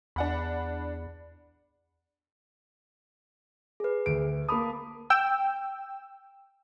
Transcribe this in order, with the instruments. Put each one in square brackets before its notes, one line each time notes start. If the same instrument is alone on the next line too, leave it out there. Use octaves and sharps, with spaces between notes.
[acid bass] E2 [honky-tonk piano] D4 F#5 B5
[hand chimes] G#4 B4
[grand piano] D2 D7
[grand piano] A#3 D#6 [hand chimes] A5 B5 D6
[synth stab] G5 E6